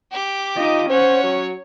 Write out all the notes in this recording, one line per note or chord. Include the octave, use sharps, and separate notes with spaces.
G4 D6
D#4 F4 D#5
C#4 C5 C#5 F#5
F#3